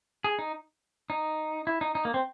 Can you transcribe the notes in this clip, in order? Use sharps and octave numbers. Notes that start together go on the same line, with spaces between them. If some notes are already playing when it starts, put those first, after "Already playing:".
G#4
D#4
D#4
E4
D#4
D#4
A#3
C4